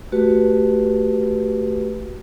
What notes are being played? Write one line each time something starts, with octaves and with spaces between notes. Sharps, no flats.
A3 F#4 G4 B4